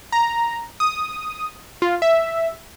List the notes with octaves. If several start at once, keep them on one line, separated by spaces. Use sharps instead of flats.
A#5
D#6
F4
E5